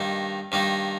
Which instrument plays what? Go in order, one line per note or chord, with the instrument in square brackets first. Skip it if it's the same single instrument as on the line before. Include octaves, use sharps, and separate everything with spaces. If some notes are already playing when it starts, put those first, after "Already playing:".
Already playing: [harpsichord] G2 D#3 A#3 D#4
G2 D#3 A#3 D#4